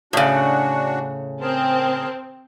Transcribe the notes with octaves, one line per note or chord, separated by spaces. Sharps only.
A2 C#3 D4 F#4
C4 G#4 A#4 A5